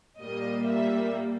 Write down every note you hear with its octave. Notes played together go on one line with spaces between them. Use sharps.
A#2 G3 A#3 D#5
E5